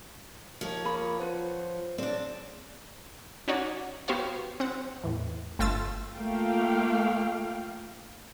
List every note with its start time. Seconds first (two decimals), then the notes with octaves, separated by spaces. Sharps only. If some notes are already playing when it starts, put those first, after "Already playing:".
0.61 D#2 F3 C#5
0.84 A#3 F4 G#4 B5
1.19 F4 B4 C5 F#5
1.98 C#3 C4 D4 D5
3.48 C#4 D#4 F#4 C#5 D5
4.08 B3 F#4 G4 C5 C#5 F5
4.60 C4 F#5
5.04 E2 A2
5.59 G1 A3 F4 E6 A6
6.16 A3 A#3 F4 F5 G5